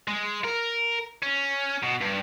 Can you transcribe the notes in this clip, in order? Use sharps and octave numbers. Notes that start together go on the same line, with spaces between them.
G#3
A#4
C#4
B2
G2